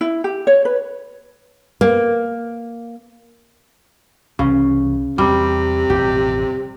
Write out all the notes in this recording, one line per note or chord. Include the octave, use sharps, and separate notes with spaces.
E4
G4
C#5
B4
A#3
C2 C#3 E3
E2 C3 G3
A1 F2 B2 G4